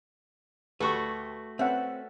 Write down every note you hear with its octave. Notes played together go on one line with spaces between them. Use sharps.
D2 A3 F#4 G4 B4 C#6
C4 C#4 A4 B4 E5 F#5